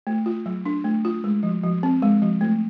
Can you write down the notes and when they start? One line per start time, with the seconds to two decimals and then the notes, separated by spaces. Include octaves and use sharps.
0.07 A3
0.26 F4
0.46 F#3
0.66 D4
0.84 A3
1.05 F4
1.24 G#3
1.43 F3
1.63 F3
1.83 C4
2.02 G#3
2.22 F3
2.41 A3